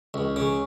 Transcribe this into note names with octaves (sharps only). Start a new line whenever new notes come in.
C#2
C#3